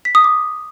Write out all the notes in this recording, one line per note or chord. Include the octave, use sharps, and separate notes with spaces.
B6
D#6
D6